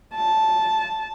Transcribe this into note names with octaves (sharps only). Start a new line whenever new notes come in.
A5